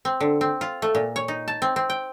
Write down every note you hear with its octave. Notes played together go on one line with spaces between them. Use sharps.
C4
D3
C4
F4
A3
A#2
C#5
D#4
A5
C4
C4
G5